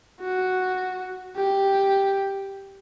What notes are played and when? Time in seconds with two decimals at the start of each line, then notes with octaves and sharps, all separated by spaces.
0.21 F#4
1.36 G4